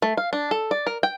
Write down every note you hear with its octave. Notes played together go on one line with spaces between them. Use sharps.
A3
F5
D4
A4
D5
A#4
G5